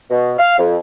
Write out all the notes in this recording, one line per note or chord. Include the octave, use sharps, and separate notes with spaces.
B2
F5
F2